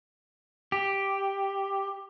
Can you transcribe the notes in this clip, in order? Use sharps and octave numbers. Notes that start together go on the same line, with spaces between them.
G4